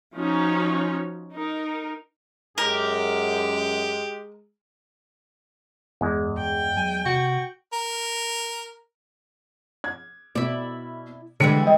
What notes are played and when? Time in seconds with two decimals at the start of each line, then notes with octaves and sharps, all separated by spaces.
0.15 F3 C#4 D#4 F#4 C#5
1.32 D#4 A#4
2.58 F#2 G#3 G4 A#4
6.01 E2 G2 G#3
6.38 G2 G5
6.77 F#3 G#5
7.06 C3 F#4
7.73 A#4
9.84 G#6
10.35 B2 E4 D5
11.40 D3 E3 G3 G#3 C#7
11.63 D#5 G5